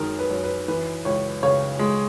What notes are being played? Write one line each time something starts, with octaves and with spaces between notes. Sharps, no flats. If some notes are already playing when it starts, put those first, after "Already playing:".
Already playing: F#2 D#3 G#3 A#4
B4
F#2
B4
E3 B4
C#2 C#5
C#3 C#5
G#3